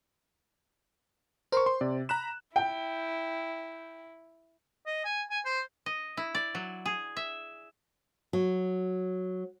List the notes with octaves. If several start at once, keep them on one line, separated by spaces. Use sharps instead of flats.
A#4 C5 C6 C#6
C6
C3 D5
A#5 B5 F#6 E7
E4 G5
D#5
G#5
G#5
C5
D#5
E4
D5
F#3
G#4
E5
F#3